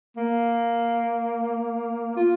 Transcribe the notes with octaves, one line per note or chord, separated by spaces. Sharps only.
A#3
F4